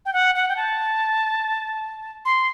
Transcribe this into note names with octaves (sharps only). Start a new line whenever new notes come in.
G5
F#5
F#5
G5
A5
C6